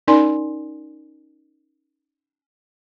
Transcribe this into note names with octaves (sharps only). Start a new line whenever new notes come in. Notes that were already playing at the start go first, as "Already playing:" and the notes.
C#4 D#4 A#4 D5 G#5 C6